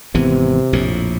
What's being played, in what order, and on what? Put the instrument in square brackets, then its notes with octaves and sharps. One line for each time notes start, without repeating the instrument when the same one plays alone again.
[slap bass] G#1 E3 B3 [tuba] C3
[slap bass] A#1 F2 A2